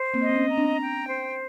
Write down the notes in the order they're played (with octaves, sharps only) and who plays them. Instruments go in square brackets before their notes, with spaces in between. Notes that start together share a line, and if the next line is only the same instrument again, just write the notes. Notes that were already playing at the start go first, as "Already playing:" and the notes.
Already playing: [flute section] C5
[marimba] A#3 C4
[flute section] D#5
[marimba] C4
B3 C#4
[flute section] A#5
[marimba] C4 D4
[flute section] G5
C5